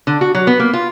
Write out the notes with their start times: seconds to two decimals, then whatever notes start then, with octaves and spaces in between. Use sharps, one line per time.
0.07 D3
0.21 F#4
0.35 F#3
0.47 B3
0.60 A#3
0.73 F4